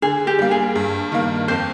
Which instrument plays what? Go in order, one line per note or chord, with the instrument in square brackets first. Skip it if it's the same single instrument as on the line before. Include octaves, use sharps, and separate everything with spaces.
[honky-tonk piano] D3 [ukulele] G#4
[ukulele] G4
[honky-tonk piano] G3 A#3
[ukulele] G#4
[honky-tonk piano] G2
D#3 A#3
[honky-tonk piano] F2 [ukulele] C5